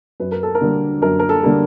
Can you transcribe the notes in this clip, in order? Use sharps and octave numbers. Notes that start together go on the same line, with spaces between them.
F#2 B4
A#4
A4
A#4
D3 G3 A#3
F#2 A#4
A#4
A4
D3 G3 A#3